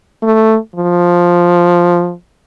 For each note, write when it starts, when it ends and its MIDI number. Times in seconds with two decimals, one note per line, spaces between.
0.23 0.57 57
0.76 2.13 53